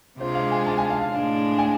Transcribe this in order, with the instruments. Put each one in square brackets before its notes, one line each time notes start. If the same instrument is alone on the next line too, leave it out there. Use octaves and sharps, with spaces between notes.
[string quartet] C3 G#3 D4 F4 [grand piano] C5
[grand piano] F5
G#5
A5
G#5
F5
F5
[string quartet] A2 G#3 D4
[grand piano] G#5